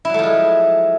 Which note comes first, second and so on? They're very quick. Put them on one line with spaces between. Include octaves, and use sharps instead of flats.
E4 F#3 A3 F3 G#3